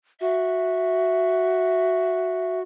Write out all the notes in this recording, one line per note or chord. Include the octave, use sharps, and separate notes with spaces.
F#4 E5